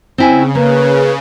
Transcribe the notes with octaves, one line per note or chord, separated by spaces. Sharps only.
C#3 C4 E4 G#5
A#3 B4